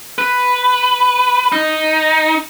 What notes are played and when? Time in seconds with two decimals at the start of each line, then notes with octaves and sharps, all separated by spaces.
0.18 B4
1.52 D#4